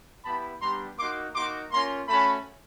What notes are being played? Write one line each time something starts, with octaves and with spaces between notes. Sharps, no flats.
B3 E4 G4 A5 B5
G3 B3 D4 G4 A#5 C6
A#3 D#4 F#4 C6 D6
A#3 D#4 F#4 C6 D6
A#3 C#4 F4 A#5 C6
A3 C#4 F#4 A5 B5